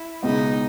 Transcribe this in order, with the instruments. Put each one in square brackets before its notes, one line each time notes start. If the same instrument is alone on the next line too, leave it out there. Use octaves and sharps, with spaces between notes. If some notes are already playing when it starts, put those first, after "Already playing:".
Already playing: [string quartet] E4
[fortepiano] C#2 B2 G#3 [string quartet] D#4